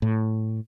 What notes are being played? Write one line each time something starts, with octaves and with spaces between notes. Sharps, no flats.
A2